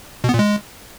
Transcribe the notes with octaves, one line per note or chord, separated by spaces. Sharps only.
B2
B3
A#2
G#3